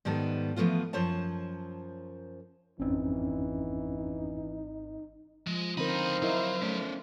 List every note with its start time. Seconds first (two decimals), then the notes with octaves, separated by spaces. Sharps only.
0.05 G#2 D#3 G3 B3 A4
0.56 E3 F3 A3 B3 F4
0.93 F#2 F3 C5 C#5 A5
2.80 G#1 F2 E3 C4 C#4 D#4
5.47 F3 G#3
5.77 C#2 D3 C4 D#4 A#4 C5 F5 B5
6.22 F#3 E4 A#4 D#5
6.62 A3 C#4 D5